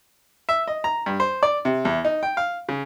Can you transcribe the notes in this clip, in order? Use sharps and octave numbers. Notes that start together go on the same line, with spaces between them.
E5
D#5
A#5
G2
C5
D5
C3
E2
D#4
G5
F5
C#3